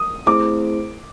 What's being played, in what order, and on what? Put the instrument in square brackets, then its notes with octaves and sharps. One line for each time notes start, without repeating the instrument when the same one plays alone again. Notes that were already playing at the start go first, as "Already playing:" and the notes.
Already playing: [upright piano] D#6
[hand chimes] A3 C4 E4 G#4 C5 [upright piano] D6